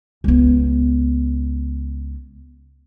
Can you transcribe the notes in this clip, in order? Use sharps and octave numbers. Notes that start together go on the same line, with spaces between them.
C#2 B3